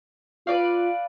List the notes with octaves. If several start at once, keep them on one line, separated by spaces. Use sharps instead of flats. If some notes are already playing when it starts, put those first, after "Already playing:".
F4 B4 D5 F5